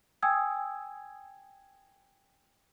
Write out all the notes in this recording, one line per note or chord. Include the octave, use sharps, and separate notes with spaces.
G5 G#5 D#6 E6 G#6